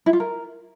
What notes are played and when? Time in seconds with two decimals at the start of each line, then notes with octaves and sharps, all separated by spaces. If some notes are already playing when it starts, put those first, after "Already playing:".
0.06 E4
0.13 F4
0.20 A#4